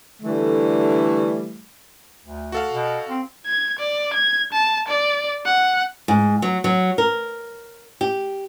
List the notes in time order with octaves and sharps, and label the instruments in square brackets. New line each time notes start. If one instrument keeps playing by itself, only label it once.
[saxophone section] D3 E3 G3 A3
[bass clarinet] D2
[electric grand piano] F#4 A4 F5
[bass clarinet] B2
C4
[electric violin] G#6
D5
G#6
A5
D5
F#5
[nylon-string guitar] G#2
F#3
F#3
A#4
G4